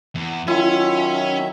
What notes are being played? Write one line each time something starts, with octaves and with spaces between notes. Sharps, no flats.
E2
D#3 F#3 C#4 E4 F4 E5